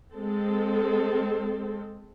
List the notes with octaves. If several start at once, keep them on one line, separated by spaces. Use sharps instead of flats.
G#3 C4 A4